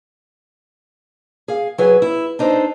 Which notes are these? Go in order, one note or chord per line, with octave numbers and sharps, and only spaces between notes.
G#4 F5
F#3 G#4 B4
E4
D4 D#4 A4 C5